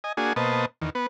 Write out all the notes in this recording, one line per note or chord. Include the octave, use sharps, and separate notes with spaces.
D#5 G#5
A#3 D4 F#4 G#4 G#5
B2 A#3 B4 C5 D#5 A5
E2 D#3
B3 B4